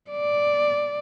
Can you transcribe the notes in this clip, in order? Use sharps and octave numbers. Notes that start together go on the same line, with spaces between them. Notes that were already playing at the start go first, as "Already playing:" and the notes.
D5